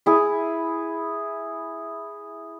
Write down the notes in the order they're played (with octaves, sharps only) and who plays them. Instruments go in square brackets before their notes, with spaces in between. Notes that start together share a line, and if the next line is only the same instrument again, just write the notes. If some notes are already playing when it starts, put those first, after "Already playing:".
[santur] E4 G#4